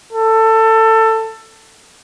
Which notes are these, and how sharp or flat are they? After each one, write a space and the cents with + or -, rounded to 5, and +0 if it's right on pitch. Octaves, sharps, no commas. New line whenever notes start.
A4 +20